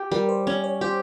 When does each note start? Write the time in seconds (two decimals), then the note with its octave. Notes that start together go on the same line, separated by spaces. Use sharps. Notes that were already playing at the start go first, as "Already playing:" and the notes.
Already playing: G4
0.11 G3 A#4
0.29 C5
0.47 C#4 C#5
0.64 C#5
0.81 G4 C5